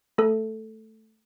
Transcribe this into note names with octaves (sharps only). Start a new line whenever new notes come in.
A3 A4